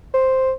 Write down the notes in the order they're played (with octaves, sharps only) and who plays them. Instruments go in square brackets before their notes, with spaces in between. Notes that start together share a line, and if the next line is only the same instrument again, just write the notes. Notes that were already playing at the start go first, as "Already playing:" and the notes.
[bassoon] C5